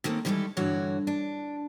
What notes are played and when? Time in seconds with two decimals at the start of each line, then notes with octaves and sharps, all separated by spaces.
0.04 D#3 A3 A#3 C4 C#4
0.25 D#3 E3 G3 G#3 E4 A4
0.57 G2 D3 E3 F#4 C#5
1.07 D4